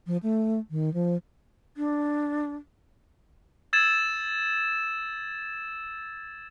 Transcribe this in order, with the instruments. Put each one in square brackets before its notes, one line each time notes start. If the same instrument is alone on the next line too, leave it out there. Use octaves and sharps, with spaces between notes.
[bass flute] F3
A3
D#3
F3
[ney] D4
[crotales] E6 G#6 A6 E7